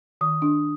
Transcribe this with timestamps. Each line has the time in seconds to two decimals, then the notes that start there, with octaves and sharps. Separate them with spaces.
0.21 D#3 D#6
0.42 D4